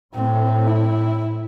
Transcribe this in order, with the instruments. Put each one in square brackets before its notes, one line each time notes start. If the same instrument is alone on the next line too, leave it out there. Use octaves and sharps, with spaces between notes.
[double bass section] A2 [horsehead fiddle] C4
[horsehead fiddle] E4